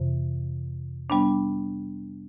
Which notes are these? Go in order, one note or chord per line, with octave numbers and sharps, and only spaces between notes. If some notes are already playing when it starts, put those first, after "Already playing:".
Already playing: F2 C3 E3
G3 B3 D4